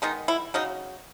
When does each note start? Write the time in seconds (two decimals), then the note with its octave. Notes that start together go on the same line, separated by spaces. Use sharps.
0.02 D#3 G#3 B3 D#4
0.28 E4
0.54 C#3 F#3 D#4